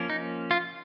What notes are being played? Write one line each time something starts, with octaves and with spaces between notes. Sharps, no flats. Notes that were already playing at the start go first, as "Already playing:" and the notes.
Already playing: F3 A#3 C#4
D#4
F4